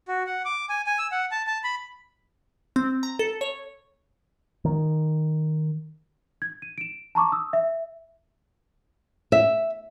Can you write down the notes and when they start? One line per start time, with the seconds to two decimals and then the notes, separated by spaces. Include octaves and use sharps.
0.08 F#4
0.27 F#5
0.45 D6
0.69 G#5
0.86 G#5
0.98 E6
1.12 F#5
1.31 A5
1.47 A5
1.64 B5
2.76 C4
3.03 A#5
3.19 A4
3.41 C#5
4.65 D#3
6.42 G#6
6.62 D#7
6.78 D7 E7
7.15 A5 A#5 C#6 D6
7.32 D#6 E6
7.53 E5
9.32 E5